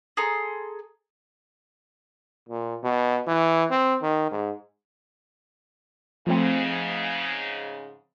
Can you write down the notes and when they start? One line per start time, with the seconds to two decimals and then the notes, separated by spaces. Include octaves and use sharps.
0.17 G#4 A4 A#5 C6
2.49 A#2
2.84 B2
3.27 E3
3.70 C4
4.02 D#3
4.31 G#2
6.27 G#2 C#3 F3 A3 C4